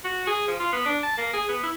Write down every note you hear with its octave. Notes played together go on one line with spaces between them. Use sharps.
F#4
G#4
F3
F4
B3
D4
A5
A#3
G#4
B3
E4